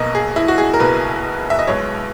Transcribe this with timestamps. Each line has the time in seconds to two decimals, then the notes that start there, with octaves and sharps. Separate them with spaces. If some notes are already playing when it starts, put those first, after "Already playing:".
Already playing: B1 B2 A#3 D#5
0.15 G#4
0.36 E4
0.48 F#4
0.58 G#4
0.74 A#4
0.80 B1 B2 A#3 B4
1.50 E5
1.59 D#5
1.67 B1 B2 G#3 B3 C#5